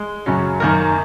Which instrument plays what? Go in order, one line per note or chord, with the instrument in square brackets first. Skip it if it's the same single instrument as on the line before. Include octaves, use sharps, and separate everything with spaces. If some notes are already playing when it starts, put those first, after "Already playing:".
Already playing: [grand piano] G#3
F#2 C#3 F#3 C#4
F#2 D#3 A#3 A#4